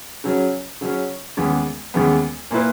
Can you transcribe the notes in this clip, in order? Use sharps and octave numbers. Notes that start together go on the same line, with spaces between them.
C#3 F#3 C#4
C#3 F#3 C#4
D#2 C#3 E3 G#3 B3
D#2 C#3 E3 G#3 B3
A#2 A#3 E4 B4